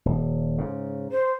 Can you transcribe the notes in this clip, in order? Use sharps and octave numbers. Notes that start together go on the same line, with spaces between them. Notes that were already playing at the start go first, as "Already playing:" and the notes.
D#1
G#2 C#3
C5